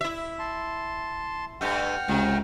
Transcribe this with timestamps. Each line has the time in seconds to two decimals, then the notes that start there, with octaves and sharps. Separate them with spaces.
0.01 E4 E5
0.39 A5 C6
1.61 G2 A3 F#5 G5 F6
2.08 C#2 C3